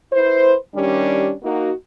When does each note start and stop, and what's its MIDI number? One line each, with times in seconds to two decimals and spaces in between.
0.13 0.57 64
0.13 0.57 71
0.13 0.57 72
0.75 1.33 51
0.75 1.33 55
0.75 1.33 61
0.75 1.33 62
0.75 1.33 67
1.44 1.73 58
1.44 1.73 63
1.44 1.73 66